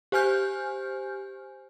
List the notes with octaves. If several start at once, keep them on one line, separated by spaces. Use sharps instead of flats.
G4 C5 G#5 F6 G6